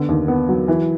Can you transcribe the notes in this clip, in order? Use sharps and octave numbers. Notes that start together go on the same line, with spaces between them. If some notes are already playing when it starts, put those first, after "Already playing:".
Already playing: D3 B3
D#2
B3
F#3
E3